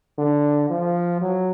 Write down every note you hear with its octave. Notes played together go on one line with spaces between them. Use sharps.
D3
F3
F#3